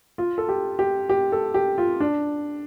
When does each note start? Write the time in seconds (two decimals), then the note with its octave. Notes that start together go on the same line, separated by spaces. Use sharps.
0.18 F4
0.38 A4
0.49 G4
0.79 G4
1.09 G4
1.32 A4
1.54 G4
1.78 F4
2.00 D4